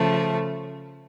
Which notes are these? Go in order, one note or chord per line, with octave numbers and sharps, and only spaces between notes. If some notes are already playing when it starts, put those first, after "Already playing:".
Already playing: C#3 F3 A3